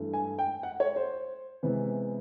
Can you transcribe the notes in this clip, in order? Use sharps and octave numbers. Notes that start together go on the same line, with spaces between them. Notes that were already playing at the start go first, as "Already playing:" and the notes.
Already playing: G2 E3 A3
G#5
G5
F#5
C#5
C5
C3 E3 G#3 B3